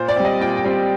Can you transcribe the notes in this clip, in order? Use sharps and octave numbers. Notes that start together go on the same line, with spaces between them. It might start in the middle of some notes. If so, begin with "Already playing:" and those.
Already playing: A#2 C5
D5
G3 C4
D#5
A#2 G5
G5
G3 C4